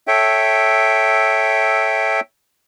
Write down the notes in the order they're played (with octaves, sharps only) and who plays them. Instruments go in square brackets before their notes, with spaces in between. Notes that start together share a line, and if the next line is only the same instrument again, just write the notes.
[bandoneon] A4 C#5 E5 G5